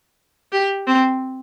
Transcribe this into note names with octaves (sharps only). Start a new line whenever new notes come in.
G4
C4